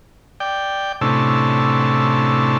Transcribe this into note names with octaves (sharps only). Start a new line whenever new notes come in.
D5 G5
A2 C3 C#4 D4 E4 A5